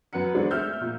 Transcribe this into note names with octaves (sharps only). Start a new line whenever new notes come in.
F#2 B4 F#5 C#7
G#3 A3 C4 D4
E5 E6 F6 G6
A#2